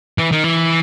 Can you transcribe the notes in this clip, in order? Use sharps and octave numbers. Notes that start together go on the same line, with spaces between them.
E3
D#3
E3